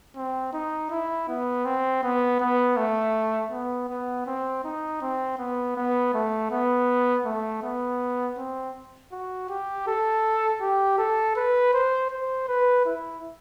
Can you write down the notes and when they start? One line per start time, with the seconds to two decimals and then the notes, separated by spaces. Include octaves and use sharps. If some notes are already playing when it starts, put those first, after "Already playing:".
0.16 C4
0.53 D#4
0.91 E4
1.29 B3
1.65 C4
2.03 B3
2.40 B3
2.77 A3
3.52 B3
3.89 B3
4.27 C4
4.64 D#4
5.02 C4
5.38 B3
5.76 B3
6.14 A3
6.51 B3
7.25 A3
7.63 B3
8.37 C4
9.12 F#4
9.49 G4
9.87 A4
10.61 G4
10.99 A4
11.36 B4
11.74 C5
12.11 C5
12.48 B4
12.86 E4